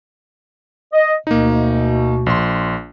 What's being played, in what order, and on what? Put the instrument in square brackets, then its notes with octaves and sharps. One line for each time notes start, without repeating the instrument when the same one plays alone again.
[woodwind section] D#5
[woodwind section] D2 B2 [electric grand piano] A#3 D#4
[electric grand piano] A#1 C6